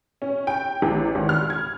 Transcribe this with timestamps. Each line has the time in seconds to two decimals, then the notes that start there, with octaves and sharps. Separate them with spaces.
0.22 C#4
0.47 G5
0.82 A1
1.15 G#1
1.29 F6
1.50 G#6